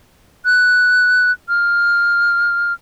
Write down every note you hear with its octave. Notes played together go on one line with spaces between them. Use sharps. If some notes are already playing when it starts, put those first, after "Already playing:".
F#6
F6